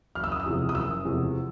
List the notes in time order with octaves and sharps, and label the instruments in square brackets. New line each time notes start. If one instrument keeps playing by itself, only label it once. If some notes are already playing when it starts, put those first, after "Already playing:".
[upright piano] F#1 F6
E6
D#6
E6
E2 C3 F3 G#3
D#6
F#1 E6
E2 C3 F3 G#3